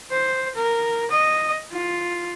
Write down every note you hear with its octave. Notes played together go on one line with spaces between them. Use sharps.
C5
A#4
D#5
F4